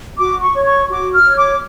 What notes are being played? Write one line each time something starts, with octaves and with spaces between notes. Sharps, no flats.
F#4 D6
C#6
C#5
C#6
F#4 D6
F6
C#5
D6